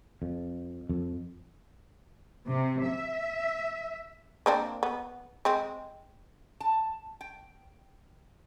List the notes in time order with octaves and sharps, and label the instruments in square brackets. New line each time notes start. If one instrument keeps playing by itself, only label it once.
[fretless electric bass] F2
F2
[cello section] C3
E5
[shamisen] A#3 C4 D4
B3
G#3 C4
[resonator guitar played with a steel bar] A5
G5